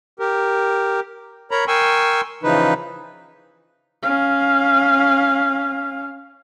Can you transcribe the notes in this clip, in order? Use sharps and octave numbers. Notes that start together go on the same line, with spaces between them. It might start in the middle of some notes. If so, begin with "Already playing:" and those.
G4 A#4
A#4 C#5 A#5 B5
A#4 G5 G#5 C6 C#6 E6
C#3 E3 F3 D#4 B4
C#4 F5